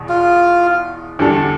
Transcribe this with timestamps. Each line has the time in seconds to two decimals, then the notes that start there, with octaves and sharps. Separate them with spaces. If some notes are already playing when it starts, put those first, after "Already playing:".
Already playing: E2 B2
0.09 F4
1.19 E2 D3 G3 D4 A4